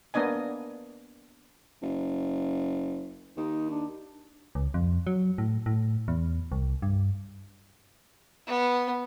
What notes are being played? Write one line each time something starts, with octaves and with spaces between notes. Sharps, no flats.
A#3 B3 D4 D#5 G#5
F#1
D#2 D#4
D4
C#2
F2
F#3
A2
A2
E2
C2
G2
B3